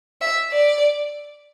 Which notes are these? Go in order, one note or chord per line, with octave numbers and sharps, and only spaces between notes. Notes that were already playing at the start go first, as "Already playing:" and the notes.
E5
D5